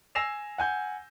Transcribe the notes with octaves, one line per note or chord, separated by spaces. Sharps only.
G#5 E6 A#6 C7 E7 F7
F#5 G#5 G6